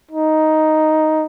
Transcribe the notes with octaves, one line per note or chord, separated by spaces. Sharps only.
D#4